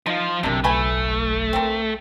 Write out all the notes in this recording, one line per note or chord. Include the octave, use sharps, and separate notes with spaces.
F3 D#4 F4
F#1 B1 C3 D4 A#4
A3 B4 G#5
A#3 C4